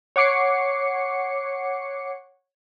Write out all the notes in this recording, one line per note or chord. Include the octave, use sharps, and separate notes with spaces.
C#5 F#5 D6 C7 C#7